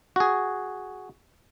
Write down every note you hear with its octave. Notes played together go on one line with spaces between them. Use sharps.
F#4 G#4